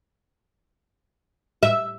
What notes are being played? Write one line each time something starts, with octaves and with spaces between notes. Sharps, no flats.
E5